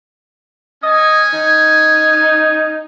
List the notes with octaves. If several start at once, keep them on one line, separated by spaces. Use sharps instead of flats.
C#4 D#5 G#5
D#4